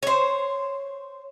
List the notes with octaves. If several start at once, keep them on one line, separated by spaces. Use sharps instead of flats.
C5 C#5